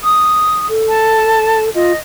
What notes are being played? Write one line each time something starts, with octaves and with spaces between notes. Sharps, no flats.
D#6
A4
A5
F4 D#5